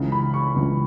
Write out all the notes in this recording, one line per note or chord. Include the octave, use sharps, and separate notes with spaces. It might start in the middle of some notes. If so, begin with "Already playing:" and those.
Already playing: C#2 C#3 E3
B5
C#6
C#2 C#3 E3